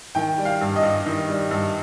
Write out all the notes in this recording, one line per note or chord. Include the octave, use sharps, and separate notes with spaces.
D#3 G5
G3
F5
G2
D#5
G2
D#3
G3
G2